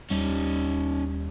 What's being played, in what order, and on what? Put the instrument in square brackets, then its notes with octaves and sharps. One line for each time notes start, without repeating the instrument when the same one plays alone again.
[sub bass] D#2 [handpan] G3 [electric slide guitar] C#4 D#4